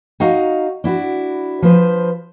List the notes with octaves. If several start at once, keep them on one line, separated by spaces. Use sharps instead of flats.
D#4 F#4 D#5 F5 F#5 A#5
D4 E4 F#4
F3 B4 C5